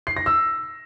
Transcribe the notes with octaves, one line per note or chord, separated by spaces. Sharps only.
C7
A#6
E6